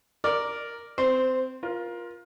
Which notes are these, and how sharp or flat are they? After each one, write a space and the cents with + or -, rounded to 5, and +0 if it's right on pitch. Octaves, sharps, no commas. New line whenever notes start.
A#4 +0 D5 +0
C4 -20 C5 +0
F4 +5 A#4 +25